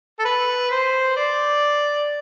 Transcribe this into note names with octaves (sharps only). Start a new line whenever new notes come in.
A4
B4
C5
D5